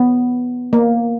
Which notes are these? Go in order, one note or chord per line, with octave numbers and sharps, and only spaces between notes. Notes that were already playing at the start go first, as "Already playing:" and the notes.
Already playing: B3
A#3